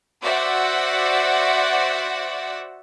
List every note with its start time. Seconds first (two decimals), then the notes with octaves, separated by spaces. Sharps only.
0.22 F#4 C5 D5 E5 F#5